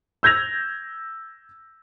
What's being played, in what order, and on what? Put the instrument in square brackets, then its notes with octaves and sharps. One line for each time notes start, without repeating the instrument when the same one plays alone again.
[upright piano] E6 G6 G#6 A#6 F7